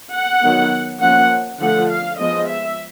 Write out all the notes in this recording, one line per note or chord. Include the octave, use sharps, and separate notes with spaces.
F#5
D#3 F#3 B3
F3 A#3 C#4 F#5
D3 F3 A3 F#5
F5
F3 G#3 B3 D#5
E5